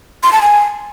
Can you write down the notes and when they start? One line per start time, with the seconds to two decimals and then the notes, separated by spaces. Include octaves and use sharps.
0.23 C6
0.33 A5
0.42 G#5